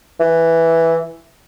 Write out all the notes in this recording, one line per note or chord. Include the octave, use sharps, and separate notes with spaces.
E3